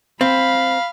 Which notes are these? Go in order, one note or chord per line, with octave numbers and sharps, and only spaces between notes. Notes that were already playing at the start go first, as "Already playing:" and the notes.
C4 F5 B5